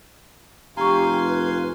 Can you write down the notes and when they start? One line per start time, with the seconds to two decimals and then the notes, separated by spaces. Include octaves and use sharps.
0.77 F1 G4 F5 G#5 A#5 C6 C#6
1.23 B4